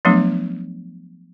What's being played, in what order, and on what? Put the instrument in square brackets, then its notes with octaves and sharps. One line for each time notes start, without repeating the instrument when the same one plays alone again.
[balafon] F3 F#3 A3 B3 D4